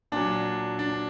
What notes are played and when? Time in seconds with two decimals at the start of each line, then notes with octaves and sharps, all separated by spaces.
0.12 A#2 F#3 D4
0.79 D4